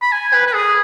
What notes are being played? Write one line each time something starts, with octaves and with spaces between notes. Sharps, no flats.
B5
G#5
B4
B4
G#4